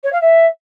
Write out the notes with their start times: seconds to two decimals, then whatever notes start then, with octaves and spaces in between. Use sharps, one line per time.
0.03 C#5
0.12 F5
0.21 E5